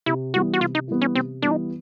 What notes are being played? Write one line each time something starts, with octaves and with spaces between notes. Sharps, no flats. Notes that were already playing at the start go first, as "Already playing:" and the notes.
C3 E4
E3 G3 B3 F#4
F#4
C3 F4
D#4
E3 G3 B3
C#4
C3 C4
E3 G3 B3 D4
D#4